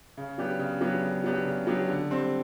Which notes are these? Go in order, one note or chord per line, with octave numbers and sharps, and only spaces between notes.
C#3
F#3 B3 D4 G4
C#3
F#3 B3 D4 G4
C#3
F#3 B3 D4 G4
C#3
F#3 B3 D4 G4
D3
G3 C4